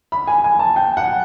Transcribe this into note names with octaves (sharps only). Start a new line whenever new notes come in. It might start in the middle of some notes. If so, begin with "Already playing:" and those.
B5
G#5
G#5
A5
G5
F#5